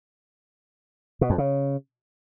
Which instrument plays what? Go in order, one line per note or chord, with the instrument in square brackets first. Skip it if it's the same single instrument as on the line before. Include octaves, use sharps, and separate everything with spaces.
[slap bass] B2
F2
C#3